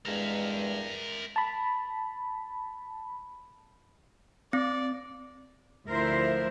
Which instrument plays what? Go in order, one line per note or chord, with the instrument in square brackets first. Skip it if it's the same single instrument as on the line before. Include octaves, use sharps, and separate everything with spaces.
[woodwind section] E2 G2 G#3 [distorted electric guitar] A#4 E5
[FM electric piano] A5 B5
[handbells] C4 [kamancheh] D5
[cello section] D2 F3 E4 A#4 C5 E5